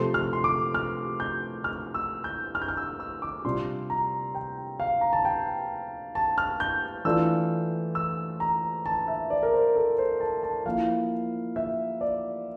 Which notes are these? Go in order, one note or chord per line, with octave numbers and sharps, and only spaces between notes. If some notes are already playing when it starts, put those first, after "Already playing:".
Already playing: C3 F3 A3 C6
F6
C6
D6
F6
G6
F6
E6
G6
F6
G6
F6
E6
E6
D6
C3 G3 D4 F4 C6
A#5
G5
F5
A#5
A5
G5
A5
F6
G6
E3 A3 D4 F4 E6
E6
A#5
A5
E5
D5
A#4
C5
A4
C5
A5
A5
F3 A#3 E4 F5
E5
D5